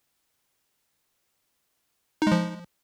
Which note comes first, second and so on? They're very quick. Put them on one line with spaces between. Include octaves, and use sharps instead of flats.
D#4 G#3 F3